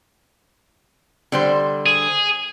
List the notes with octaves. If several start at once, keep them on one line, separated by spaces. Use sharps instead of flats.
D3 G3 C5
G#4